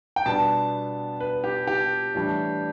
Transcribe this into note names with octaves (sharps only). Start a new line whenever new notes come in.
G5
B2 G3 B3 D4 A5
B4
G4
G4
A2 E3 G3 D4